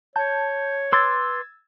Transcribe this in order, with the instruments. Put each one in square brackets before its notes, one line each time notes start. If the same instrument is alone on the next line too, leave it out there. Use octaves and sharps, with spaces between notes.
[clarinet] C#5 [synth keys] A5 G6
[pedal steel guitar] B4 C6 D6 [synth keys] E6 G#6 A6